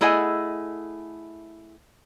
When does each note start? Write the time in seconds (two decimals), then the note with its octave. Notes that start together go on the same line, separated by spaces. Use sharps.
0.01 A3 E4 G#4 D#5 F#5 G#5